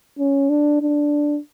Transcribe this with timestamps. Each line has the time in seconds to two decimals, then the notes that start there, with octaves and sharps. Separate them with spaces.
0.19 C#4
0.50 D4
0.82 D4